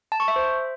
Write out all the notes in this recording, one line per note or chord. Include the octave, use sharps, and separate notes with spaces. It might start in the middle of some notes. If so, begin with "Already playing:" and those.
A5
C#6
E5
C5